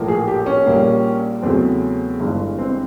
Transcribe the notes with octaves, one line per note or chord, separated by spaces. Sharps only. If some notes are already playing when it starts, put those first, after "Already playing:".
Already playing: A#1 A2 F3 A#3
G#4
G4
C#4
A#1 A#2 G3 A#3
E2 C#3 F#3 A3 C4
G1 G2 E3 G#3
C4